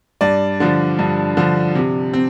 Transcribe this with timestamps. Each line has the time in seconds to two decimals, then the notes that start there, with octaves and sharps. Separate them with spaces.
0.21 G2 D5
0.60 D3 F3
0.99 G2
1.37 D3 F3
1.75 C3
2.13 C4